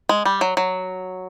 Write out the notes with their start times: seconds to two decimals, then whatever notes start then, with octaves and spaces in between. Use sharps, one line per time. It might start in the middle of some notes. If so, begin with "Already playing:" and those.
0.09 G#3
0.25 G3
0.41 F#3
0.57 F#3